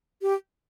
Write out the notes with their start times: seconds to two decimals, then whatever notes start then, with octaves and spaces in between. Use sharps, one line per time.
0.22 G4